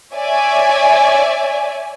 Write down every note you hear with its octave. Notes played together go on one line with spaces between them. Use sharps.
C#5 D5 E5 G#5